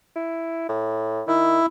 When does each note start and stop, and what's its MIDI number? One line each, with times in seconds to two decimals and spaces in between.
0.16 0.66 64
0.69 1.22 45
1.27 1.60 51
1.27 1.66 64